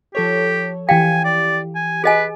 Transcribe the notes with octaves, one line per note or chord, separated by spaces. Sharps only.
F3 G4 A4 C#5
E3 G4 F5 G5 G#5
D5
G#5
G#4 B4 D#5 G#5